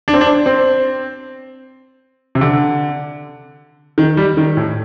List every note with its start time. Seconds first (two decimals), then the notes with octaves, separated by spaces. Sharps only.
0.08 D4
0.14 C4
0.21 D4
0.46 C4
2.35 C3
2.41 D3
3.98 D#3
4.17 G3
4.37 D#3
4.57 A2